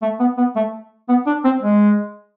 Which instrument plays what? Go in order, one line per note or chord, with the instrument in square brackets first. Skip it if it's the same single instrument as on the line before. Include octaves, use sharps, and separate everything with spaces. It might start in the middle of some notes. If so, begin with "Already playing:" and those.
[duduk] A3
B3
B3
A3
B3
D4
C4
G#3